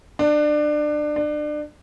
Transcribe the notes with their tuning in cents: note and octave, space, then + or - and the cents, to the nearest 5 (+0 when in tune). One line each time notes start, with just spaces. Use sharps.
D4 +25
D4 +30